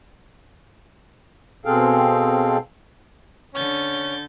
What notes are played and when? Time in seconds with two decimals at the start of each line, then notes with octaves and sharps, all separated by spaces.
1.66 B2 C4 G#4 A4 F5 G5
3.54 D3 C#4 G6 A6